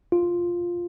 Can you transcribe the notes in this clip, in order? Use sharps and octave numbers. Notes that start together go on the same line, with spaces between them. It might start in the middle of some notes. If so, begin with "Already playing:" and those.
F4